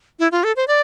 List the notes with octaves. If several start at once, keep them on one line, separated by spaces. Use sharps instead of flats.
E4
F4
A4
C5
D5